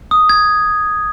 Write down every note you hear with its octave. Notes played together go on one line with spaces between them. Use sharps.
D#6
G#6